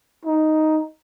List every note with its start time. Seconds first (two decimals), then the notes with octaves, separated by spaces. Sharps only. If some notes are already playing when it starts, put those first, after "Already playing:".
0.25 D#4